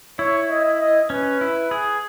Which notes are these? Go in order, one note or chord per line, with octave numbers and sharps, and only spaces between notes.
E4 C#5
D#5
D#5
C#4 B4
E4
G#4